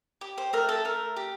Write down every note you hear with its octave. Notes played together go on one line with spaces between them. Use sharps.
G4
C5
A3 A#4
A4
A3 A#4
G4